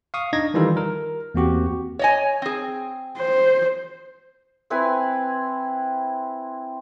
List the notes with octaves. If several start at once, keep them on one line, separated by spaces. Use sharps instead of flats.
F5 C#6 D#6
D4 D#4 D#5 G#6 A#6
D#3 E3 G3 D#4 F4 A4
A#4
E2 A#3 C4 F#4 G4
C#5 D#5 G#5
C4 G#4
C5
C4 E4 B4 G#5